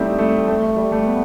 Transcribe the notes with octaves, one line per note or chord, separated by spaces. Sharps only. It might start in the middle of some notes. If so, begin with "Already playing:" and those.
Already playing: G3 A3 C4 D#4 E4
A3
A3
A3
G3
A3
B3